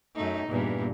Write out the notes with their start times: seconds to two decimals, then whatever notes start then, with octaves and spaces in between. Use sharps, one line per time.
0.15 F#2 A3 D#4
0.48 E2 G2 A#2